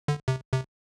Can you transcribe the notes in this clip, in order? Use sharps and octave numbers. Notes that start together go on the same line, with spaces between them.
D3
C3
C3